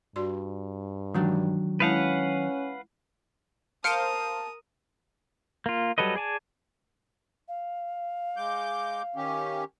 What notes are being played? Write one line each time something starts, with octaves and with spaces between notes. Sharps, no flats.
G2 F#4 D5 C6
D#3 E3 F#3 G#3 D4
G#3 C#4 E4 B4 F5 F#5 A5
A#4 C5 F5 A5 D#6 F6 C#7 D7
A#3 F4
F#3 G3 A4 B4 D#5
G#4 D5 G#5 A5
F5
G#3 D6 G6
D#3 C#4 G4